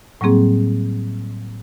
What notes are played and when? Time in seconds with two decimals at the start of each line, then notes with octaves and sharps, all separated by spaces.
0.21 A2 F#3 G3 A#3 C4 G#4